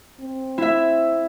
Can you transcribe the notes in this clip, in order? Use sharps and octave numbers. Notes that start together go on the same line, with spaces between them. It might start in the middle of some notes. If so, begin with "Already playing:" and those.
C4
E4 E5